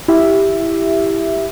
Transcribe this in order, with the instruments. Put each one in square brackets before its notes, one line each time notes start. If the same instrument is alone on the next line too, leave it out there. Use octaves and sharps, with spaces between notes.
[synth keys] E4 G4 E5